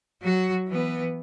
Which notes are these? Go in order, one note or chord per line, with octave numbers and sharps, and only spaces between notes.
F#3 F#4
E3 B3